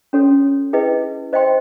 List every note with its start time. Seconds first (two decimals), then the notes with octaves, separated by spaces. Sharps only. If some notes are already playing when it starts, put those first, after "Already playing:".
0.13 C#4 F#4 A4 C#5
0.73 E4 G#4 B4 D#5 G5
1.33 C5 D#5 G5 C6